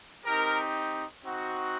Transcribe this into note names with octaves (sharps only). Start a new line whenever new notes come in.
C4 D#4 G4 A#4
C4 D#4 F#4